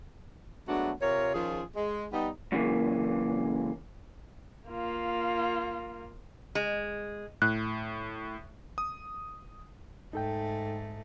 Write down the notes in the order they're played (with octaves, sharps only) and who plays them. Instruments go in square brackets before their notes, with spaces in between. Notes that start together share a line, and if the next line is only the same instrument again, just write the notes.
[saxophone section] F#3 G#3 A3 B3 D4 F#4
C3 F4 A#4 C#5
D#3 F3 C#4 F4 G#4
G#3
G3 B3 D#4
[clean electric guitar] F#2 C#3 E3 A#3
[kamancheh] A#3 F4
[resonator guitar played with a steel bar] G#3
[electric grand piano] A2 [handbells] F#6
[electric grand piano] D#6
[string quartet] G#2 A3 [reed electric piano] D#4 A4 G5